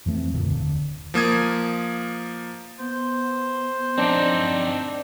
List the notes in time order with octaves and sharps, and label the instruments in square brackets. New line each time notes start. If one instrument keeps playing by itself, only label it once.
[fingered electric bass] F2 E3 A3 C4
C#2 F#2 A#2 D3
D#1 D3
[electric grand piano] F3 A#3 D#6 G#6
[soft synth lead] B3 [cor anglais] C5
[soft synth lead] F3 [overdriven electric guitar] C4 D#4 [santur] D4